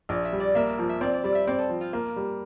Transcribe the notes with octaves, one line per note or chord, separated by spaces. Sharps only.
A#1 D5
E5
G3
D5
A#3 E5
E5
F3
E5
C4 D5
D5
G3 D5
E5
C4 D5
A4
F3
F4
A#3
G3